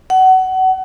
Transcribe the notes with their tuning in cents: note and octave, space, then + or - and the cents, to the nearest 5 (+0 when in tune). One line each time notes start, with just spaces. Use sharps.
F#5 +25